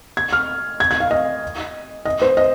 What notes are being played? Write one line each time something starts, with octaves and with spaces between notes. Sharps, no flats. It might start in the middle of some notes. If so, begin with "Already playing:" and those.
G#6
F6
G#6
G#6
F5
D#5
D#5
C5
D#5